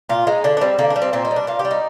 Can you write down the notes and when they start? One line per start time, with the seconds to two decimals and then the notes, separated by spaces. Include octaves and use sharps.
0.09 A#2 F4
0.27 G#3 D#4
0.44 D3 D4
0.57 D4
0.61 G3 C4
0.79 D3 A#3
0.90 D4
0.96 G3
1.02 C4
1.13 A#2 C4
1.25 D#4
1.31 G3
1.36 D4
1.47 A#2 F4
1.59 G4
1.65 G3
1.71 D#4